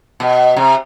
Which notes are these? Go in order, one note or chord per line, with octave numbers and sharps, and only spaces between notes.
B2
C3